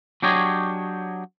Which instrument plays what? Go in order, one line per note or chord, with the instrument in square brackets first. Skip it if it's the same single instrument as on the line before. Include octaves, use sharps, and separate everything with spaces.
[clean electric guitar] F#3 D4 G4 G#4 C#5 D#5